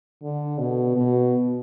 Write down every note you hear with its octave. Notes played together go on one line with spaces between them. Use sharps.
D3
B2
B2